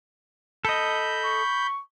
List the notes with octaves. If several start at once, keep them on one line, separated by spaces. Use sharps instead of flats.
A4 D#5 B5 G6
C#6